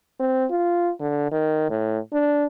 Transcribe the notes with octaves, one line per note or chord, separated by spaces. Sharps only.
C4
F4
D3
D#3
A2
D4